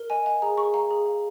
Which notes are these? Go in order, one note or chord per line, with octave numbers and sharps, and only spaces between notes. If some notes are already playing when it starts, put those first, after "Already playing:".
Already playing: A#4
D#5 G#5
F5 G#5
G#4 A#5
G#4 C#6
F5 A#5
G#4
F5